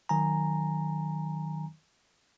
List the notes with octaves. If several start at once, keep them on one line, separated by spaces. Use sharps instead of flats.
D#3 F#3 G#5 A#5